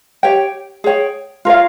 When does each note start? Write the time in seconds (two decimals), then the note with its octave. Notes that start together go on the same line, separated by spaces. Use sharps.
0.23 G4 C#5 G5
0.84 G#4 C#5 G5
1.45 F4 A#4 C#5 F5